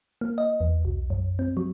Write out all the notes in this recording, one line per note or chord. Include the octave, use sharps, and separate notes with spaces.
A#3
D#5
E2
B1
F#2
C4
F#3